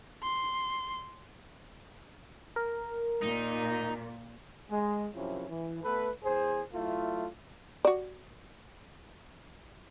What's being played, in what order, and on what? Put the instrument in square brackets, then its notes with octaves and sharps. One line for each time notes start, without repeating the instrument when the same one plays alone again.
[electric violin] C6
[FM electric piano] A#4
[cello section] A#2 [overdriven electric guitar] D#4
[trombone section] G#3
F#2 C3 F3 C#4 E4
E3
A3 B3 A4 B4
E2 G#4 C5
F#3 A3 E4 F4
[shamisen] F#4 D5